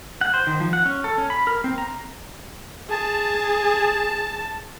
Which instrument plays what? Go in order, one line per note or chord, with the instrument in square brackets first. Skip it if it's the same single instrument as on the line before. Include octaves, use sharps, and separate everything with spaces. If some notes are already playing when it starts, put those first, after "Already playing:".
[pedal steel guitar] F#5
C5
D#3
F3
F#5
C#4
A4
C#4
B5
A#4
C4
A#5
[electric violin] G#4 [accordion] A5